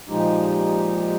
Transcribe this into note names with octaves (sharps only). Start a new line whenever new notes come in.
A#2 F3 G#3 D#4 G4